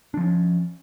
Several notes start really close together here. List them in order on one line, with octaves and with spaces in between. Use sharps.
D4 F3 C#4